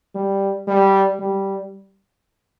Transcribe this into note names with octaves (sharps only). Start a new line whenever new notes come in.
G3
G3
G3